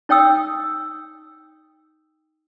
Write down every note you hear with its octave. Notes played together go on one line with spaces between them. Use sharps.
D#4 C#5 G5 D#6 E6